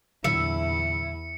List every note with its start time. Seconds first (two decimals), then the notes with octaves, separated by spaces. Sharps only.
0.24 E2 A#2 D3 F#3 E4 E5 C#7